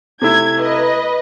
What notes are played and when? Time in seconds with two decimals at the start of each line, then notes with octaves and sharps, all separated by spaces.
0.22 C3 A3 E4 G#6
0.60 B4 D#5